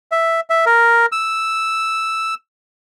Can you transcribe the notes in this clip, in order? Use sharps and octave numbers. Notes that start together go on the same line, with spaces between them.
E5
E5
A#4
E6